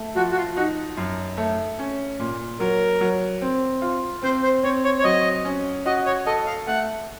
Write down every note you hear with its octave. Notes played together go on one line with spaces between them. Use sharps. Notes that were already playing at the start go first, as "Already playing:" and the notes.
Already playing: A3
F3 F#4
F#4
F4
D#4 F#4
F#2
A3
C#4
A#2
F#3 A#4
F#3
C4
F4
C4 C5
C5
C4 C#5
C#5
C#5
F#3 D#5
C#4
F#4 D#5
C#5
A4 D#5
F5
A3 F#5